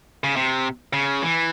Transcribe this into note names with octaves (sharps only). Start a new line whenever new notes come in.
C#3
C3
C#3
E3